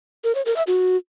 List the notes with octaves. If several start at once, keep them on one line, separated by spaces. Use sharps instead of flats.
A#4
C#5
A#4
E5
F#4